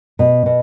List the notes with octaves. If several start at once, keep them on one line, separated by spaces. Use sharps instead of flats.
B2
B2